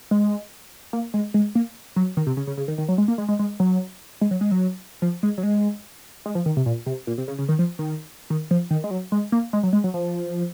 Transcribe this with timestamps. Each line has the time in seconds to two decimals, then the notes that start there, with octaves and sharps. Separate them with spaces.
0.11 G#3
0.93 A#3
1.14 G#3
1.34 G#3
1.55 A#3
1.96 F#3
2.17 D#3
2.27 C3
2.37 C#3
2.47 C#3
2.57 C#3
2.68 D#3
2.78 D#3
2.88 F#3
2.98 G#3
3.08 A#3
3.18 G#3
3.28 G#3
3.39 G#3
3.60 F#3
4.21 G#3
4.31 F#3
4.41 G#3
4.51 F#3
5.02 F3
5.23 G#3
5.38 F#3
5.43 G#3
6.26 G#3
6.35 F3
6.46 D#3
6.57 C3
6.66 A#2
6.86 C3
7.07 A#2
7.18 C3
7.28 C#3
7.38 C#3
7.49 D#3
7.59 F3
7.79 D#3
8.30 D#3
8.51 F3
8.70 D#3
8.84 G#3
8.91 F#3
9.12 G#3
9.32 A#3
9.53 G#3
9.63 F#3
9.73 G#3
9.84 F#3
9.94 F3